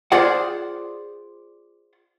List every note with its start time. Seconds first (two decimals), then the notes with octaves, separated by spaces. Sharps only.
0.12 F4 G#4 C5 D5 F#5